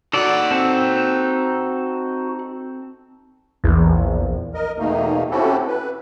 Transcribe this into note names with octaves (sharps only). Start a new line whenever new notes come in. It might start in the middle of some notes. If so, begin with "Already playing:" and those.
D#4 F#4 A4 D5 F#5
C4 A4
A#1 E2
A#4 D#5
E2 B2 D#3 A3 A#3 D#4
C4 C#4 E4 F#4 G4 A4
B4